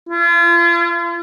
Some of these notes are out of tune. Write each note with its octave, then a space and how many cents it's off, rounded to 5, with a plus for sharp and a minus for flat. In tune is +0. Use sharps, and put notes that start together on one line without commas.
F4 -40